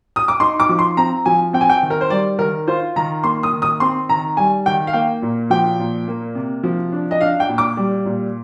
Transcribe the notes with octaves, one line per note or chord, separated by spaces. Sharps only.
D#6
D6
D#4 C6
D6
F3
C6
C4 A#5
F3 G#5
C4 G5
G#5
G5
D#3
A#4
C5
G3 D5
D#3 A#4
F4 C5
D#3 A#5
A#3 C6
D#6
D#3
D#6
C4 C6
D#3 A#5
G3 G#5
D#3 G5
F5
A#3 G5
A#2
F3 G5
A#2
A#3
C3
F3
D4
D#5
D4 F5
G5
A#2
D6
G3
A#2